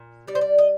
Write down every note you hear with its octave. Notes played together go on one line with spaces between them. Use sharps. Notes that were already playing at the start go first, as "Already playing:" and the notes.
Already playing: A#2
G3 D5
C5
D5
D#5